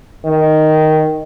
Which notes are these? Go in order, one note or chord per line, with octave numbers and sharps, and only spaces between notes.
D#3